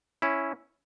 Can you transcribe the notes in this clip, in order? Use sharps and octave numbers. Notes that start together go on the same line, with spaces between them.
C#4 E4